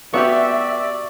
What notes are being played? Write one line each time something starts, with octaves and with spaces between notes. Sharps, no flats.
B3 F#4 G4 D5 E5 C#6